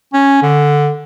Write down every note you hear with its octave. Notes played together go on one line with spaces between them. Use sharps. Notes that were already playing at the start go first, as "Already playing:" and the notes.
C#4
D3